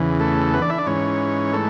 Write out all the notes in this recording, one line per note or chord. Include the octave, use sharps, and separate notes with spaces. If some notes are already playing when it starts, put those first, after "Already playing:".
Already playing: E2 C#3 E3
A3 A4
B3 B4
D4 D5
E4 E5
D4 D5
G#2 E3 C#4 C#5
A3 A4